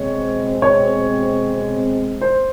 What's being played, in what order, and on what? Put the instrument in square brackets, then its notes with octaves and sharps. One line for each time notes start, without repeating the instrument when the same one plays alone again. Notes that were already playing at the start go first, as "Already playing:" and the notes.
Already playing: [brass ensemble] B2 G#3 C4 [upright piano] C#5
[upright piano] C#5
C5